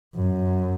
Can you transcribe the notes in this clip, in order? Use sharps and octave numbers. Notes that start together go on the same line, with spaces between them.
F#2